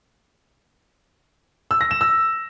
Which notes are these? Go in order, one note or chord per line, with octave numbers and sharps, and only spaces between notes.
E6
A#6
E7
E6